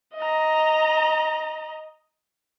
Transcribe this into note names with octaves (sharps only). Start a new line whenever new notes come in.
D#5 A#5